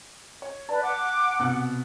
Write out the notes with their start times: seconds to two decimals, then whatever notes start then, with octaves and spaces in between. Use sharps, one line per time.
0.42 C#5
0.69 B4 D5 A5
0.82 F#5 D6
1.39 C2 B2 F#6